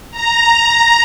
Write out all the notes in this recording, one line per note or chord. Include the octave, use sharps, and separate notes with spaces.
A#5